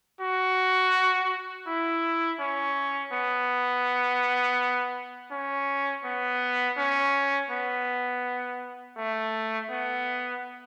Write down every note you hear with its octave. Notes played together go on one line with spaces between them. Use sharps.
F#4
E4
C#4
B3
C#4
B3
C#4
B3
A3
B3